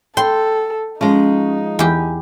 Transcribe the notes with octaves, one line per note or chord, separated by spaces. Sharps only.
A4 G5 C6
F3 G#3 C#4 D#4
E2 G4 G#5